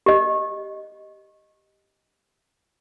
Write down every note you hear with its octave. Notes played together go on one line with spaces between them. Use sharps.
G4 D#5